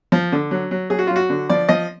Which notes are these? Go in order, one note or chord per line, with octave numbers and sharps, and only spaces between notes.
F3
D3
F#3
F#3
F#3 G#4
F#4
F#3 F4
F#4
D3
F3 D5
F3 D#5